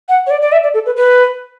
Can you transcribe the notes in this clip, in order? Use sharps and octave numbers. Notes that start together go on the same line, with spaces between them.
F#5
C#5
D5
D5
E5
D5
A4
B4
B4